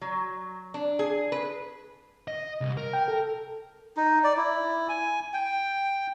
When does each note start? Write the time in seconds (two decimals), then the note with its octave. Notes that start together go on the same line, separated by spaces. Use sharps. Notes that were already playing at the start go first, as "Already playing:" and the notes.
0.01 F#3
0.74 D4
0.99 G#4
1.32 B4
2.28 D#5
2.61 C2
2.77 A#4
2.93 G5
3.08 A4
3.97 D#4
4.24 D5
4.37 E4
4.89 G#5
5.33 G5